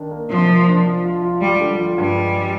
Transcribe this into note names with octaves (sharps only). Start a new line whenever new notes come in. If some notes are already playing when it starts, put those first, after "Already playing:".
Already playing: D#3 D4
A#3
C3 F3
A#3
D4
F3
F4
F4
G3 F4
D3
F3
G2 G3
G#3